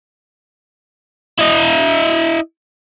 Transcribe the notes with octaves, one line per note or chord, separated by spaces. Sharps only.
E4 D#5